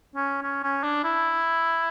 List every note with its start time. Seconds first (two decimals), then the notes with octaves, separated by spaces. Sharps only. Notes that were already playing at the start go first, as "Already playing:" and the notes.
0.16 C#4
0.42 C#4
0.63 C#4
0.83 D4
1.04 E4